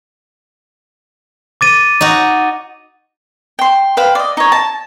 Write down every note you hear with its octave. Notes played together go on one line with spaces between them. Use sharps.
D6 A6 D#7
D#4 F#4
G5 C6
B4 C5 F5 G5
D5 D#5
D#4 C#5
A5